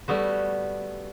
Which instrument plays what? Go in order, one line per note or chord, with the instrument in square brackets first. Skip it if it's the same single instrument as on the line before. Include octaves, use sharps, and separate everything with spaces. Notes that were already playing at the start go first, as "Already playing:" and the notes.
[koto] G3 A3 B3 F#4